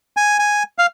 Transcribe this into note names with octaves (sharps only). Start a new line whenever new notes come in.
G#5
G#5
F5